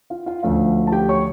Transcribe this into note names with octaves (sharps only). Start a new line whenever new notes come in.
F4 F5
F4 F5
D2 D3 F3 A3 C#4 F4 F5
A5
G4 G5
C#5 C#6